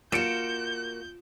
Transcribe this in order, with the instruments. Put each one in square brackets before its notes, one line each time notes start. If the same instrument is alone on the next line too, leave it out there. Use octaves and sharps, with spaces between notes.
[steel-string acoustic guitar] A#3 F#4 [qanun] F4 [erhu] G6 [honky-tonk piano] C#7 D7 E7